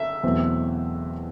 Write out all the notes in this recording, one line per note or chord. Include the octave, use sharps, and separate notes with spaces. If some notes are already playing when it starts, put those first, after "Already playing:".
Already playing: E5
E2 B2 F#3 A3 C4